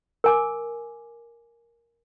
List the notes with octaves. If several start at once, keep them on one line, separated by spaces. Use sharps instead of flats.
A#4 G#5 D6